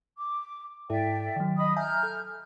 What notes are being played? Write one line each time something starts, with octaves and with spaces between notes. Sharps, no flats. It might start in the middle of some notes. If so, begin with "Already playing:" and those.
D6
G#2 E4 A4 D5 E5 G5
D#3 F#3
D#5 B5 D#6
E5 G#5 A#5 F6 G6
A4